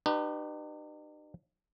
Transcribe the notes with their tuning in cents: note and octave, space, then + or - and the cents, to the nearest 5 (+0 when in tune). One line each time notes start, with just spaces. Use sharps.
D#4 -45 G4 -20 B4 +0